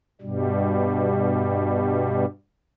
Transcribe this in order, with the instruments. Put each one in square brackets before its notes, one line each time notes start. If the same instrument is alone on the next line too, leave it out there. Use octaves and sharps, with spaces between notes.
[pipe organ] G2 B2 G3